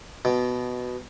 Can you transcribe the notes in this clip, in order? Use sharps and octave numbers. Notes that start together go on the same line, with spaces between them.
B2